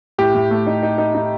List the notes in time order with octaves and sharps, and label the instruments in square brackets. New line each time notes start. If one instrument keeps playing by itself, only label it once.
[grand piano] A2 [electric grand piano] G4
[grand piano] A2
A3
D#4
D#4
D#4
D#4